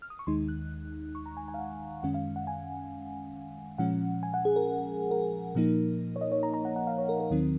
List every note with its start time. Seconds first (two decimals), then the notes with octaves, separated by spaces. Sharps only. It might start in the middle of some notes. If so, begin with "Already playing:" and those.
0.02 F6
0.10 D#6
0.19 C#6
0.27 D#2 D#3 G#3 D#4 C6
0.48 F#6
1.15 C#6
1.26 A#5
1.37 G#5
1.48 G#5
1.54 F5
1.59 F#5
2.03 F#2 D#3 G#3 C#4 F#5
2.14 F5
2.36 F#5
2.47 G#5
3.78 A#2 F3 G#3 C#4 F#5
4.23 G#5
4.34 F#5
4.45 G#4
4.56 A#4
5.11 A#4
5.55 A#2 F3 A#3 D#4
6.16 C#5
6.21 D#5
6.32 C#5
6.43 A#5
6.54 A#5
6.65 F#5
6.76 F#5
6.87 F5
6.98 C#5
7.09 A#4
7.20 A#4
7.30 D#2 D#3 F#3 C4 D#4